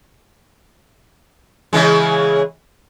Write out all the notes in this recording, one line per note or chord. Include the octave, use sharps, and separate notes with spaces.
C#3 E3 G#3